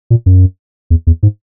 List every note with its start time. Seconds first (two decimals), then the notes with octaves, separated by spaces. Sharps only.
0.10 A#2
0.26 F#2
0.90 E2
1.07 E2
1.23 G#2